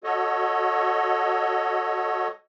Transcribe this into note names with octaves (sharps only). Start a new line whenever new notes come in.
F#4 A4 C#5 D#5